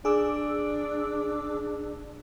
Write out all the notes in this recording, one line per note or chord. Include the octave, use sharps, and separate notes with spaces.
D4 G#4 D6 E6